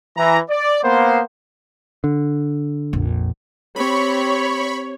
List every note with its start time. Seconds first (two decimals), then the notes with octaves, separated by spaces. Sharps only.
0.17 E3 A#5
0.50 D5
0.83 A#3 B3 C5
2.04 D3
2.93 A#1 F2
3.76 C4 G4 C#5 B5 C#6